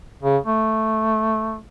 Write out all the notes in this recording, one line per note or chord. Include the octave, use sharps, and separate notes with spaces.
C#3
A3